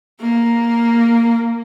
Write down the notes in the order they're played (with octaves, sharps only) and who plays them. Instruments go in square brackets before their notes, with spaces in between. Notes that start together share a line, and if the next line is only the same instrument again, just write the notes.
[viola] A#3